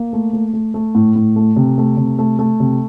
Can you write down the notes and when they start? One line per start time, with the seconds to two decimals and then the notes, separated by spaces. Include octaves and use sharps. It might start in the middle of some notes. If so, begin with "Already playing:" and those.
Already playing: A#3
0.13 A3
0.33 A3
0.53 A3
0.74 A3
0.95 A2
1.16 A2
1.36 A3
1.56 C3
1.78 A3
1.97 C3
2.19 A3
2.39 A3
2.60 C3